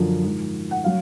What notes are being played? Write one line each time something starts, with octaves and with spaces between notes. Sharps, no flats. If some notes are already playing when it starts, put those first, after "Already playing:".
Already playing: F#2 D3 F3
G#2 F3
F#5
F#3 F5